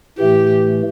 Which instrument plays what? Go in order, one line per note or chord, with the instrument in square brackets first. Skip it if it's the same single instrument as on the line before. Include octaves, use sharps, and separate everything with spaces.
[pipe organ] A2 E3 A3 [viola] G4